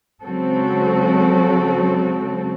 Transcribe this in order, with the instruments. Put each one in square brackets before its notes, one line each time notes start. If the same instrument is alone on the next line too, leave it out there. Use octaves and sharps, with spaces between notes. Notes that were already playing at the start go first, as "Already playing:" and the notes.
[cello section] C#3 F#3 G#3 C4 F#4 A4